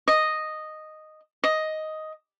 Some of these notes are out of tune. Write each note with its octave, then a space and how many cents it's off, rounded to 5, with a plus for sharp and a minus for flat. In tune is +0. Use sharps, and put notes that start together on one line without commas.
D#5 -5
D#5 +5